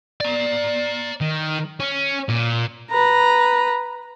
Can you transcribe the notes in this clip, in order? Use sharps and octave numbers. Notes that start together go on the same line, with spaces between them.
D5 A#5
D#3
C#4
A#2
B4 A#5